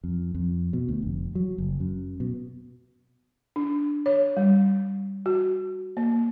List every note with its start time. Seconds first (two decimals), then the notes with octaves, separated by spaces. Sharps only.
0.04 F2
0.35 F2
0.73 B2
0.89 D2
1.02 F1
1.35 F#3
1.58 F#1
1.80 F#2
2.20 B2
3.56 D4
4.06 C#5
4.37 G3
5.26 F#4
5.97 A#3